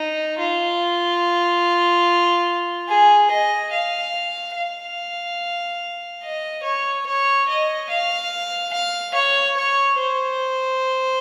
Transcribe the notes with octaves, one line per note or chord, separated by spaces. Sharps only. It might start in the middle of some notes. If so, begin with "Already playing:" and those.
Already playing: D#4
F4
G#4
D#5
F5
F5
D#5
C#5
C#5
D#5
F5
F5
C#5
C#5
C5